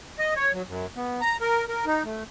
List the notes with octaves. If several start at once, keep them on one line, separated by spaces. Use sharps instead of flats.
D#5
C#5
F#3
F#2
B3
A#5
A#4
A#4
D#4
A3